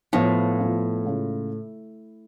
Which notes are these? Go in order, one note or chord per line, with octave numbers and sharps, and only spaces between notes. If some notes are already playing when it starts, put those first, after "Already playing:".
A2 F3 B3 F4
F3 B3 F4
C#3 G#3 C#4 F4